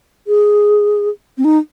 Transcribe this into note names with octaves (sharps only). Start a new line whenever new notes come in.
G#4
C4
D#4